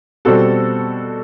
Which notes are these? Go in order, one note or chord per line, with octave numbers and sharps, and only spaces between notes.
B2 G3 C4 F#4 A4